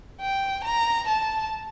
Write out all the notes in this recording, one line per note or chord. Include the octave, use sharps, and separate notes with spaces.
G5
A#5
A5